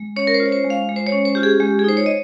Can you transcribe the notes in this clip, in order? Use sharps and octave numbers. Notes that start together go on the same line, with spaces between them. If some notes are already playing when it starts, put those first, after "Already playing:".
Already playing: G#3
C#4 C#5
A#4
C5
F4
C#5
C5
G#3
F5
G#3
C5
C#5
C#4
C5
F4 G4
G#4
G#3 G4
G#4
D#4 C5
C#5
D#5